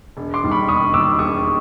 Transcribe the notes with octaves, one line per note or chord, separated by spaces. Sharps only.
E1
C6 D6
D#2 D#3 G3
B5 C#6
E1 C#6 D#6
D#2 D#3 G3 D6 E6
E1 C#6 D#6